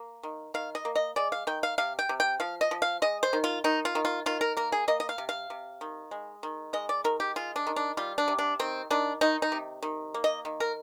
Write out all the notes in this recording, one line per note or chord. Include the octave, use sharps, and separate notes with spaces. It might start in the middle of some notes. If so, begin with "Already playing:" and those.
Already playing: A#3
D#3
D#3 F5
D#5
A#3
D#5
G#3 D5
F5
D#3 G5
F5
C3 F5
G5
C3
G5
F3 F5
D#5
F3
F5
G#3 D#5
C5
D#3
F4
D#3 D#4
F4
D#3
F4
D#3 F4
A#4
A#3 A#4
G#4
A#3 D#5
D#5
F5
C3
F5
C3
D#3
G#3
D#3
G#3 D#5
D5
D#3 A#4
G4
G#3 F4
D4
D#3
D4
G3 F4
D4
C3
D4
D#3 C4
D#3 D4
D#3 D#4
D#4
C3
D#3
A#3
D#5
D#3
A#4